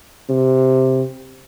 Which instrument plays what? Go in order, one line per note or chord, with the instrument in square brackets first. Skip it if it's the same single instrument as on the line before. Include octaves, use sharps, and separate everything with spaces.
[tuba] C3